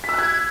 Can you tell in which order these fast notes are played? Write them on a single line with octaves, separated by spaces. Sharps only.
B6 E6 F#6 G#6